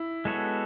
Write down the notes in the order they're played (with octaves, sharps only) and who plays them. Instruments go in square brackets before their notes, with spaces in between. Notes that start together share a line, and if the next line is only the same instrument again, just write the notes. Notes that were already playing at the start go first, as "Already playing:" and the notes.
Already playing: [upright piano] E4
[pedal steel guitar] G#3 B3 F#4 A4 C#5